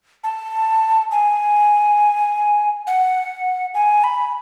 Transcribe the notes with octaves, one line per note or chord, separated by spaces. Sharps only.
A5
G#5
F#5
G#5
B5